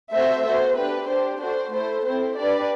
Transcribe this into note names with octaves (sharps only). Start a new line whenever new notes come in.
A3 C4 F#4 A4 C5 E5
B3 F#4 A4 C5
D4 G4 B4
D4 G4 C5
D4 F#4 A4 C5
A3 E4 A4 C5
C4 E4 A4 C5
D4 G4 B4 D5